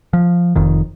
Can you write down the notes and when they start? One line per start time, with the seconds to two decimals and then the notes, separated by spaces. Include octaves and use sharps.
0.13 F3
0.55 F1 F2 D#3